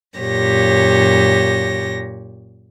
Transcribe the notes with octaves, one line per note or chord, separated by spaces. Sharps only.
F#2 A#2 G4 C#5 A#6